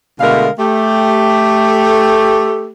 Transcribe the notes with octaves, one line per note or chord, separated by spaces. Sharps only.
B2 D3 G#3 A3 A#4 F5
A3 G4